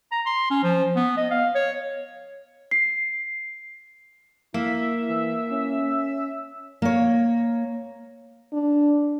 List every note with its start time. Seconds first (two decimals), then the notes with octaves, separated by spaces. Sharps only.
0.12 A#5
0.26 C6
0.51 C#4
0.63 F3
0.96 B3
1.17 D#5
1.31 F5
1.55 C#5
2.71 C7
4.54 A#3 E4 E5
5.08 E3
5.52 C#4
6.82 A#3 C#5
8.53 D4